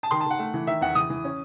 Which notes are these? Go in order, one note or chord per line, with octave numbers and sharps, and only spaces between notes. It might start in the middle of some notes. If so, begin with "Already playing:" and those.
A5
D#3 C6
A5
D#3 F#5
A3
E3
D#3 E5
E2 F#5
E3 D#6
E3
C#4